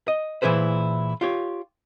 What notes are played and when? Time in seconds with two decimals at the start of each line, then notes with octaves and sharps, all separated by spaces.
0.08 D#5
0.42 A#2 E3 E4 G#4 B4 C5
1.21 F4 G4 C#5